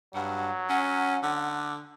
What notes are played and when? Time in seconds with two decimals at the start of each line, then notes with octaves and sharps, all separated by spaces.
0.15 G2 F#3 F#5
0.69 C#4 F#5
1.23 D3